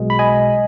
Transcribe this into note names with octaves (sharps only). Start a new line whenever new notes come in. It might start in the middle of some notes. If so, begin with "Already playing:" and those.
Already playing: B1 B2 G#3
B5
D#5 G#5